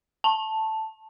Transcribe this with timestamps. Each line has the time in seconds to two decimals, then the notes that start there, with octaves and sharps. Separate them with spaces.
0.24 A5